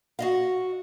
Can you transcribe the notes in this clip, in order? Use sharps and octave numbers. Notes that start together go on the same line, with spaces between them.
F#4 D#5 F5